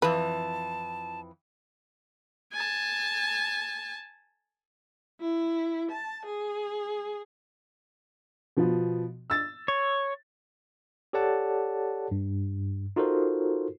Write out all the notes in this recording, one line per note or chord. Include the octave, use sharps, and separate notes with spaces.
F2 E3 B4 A5
G#5 A5
E4
A5
G#4
B2 F3 B3
E6 A6
C#5
G4 A4 C#5 D5 F#5 A5
G2
D#4 F4 F#4 A4 A#4 C5